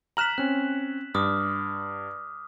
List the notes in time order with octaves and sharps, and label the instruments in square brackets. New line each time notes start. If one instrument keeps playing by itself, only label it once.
[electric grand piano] A#5 F6 F#6 [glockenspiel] B6 E7 F#7
[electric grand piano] C4 C#4 [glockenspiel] F#6
[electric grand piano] G2 [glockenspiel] D6 D#6 F6